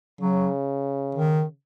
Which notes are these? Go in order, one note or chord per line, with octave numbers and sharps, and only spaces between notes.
C#3 F#3
D#3